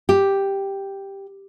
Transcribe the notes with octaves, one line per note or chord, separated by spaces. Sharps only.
G4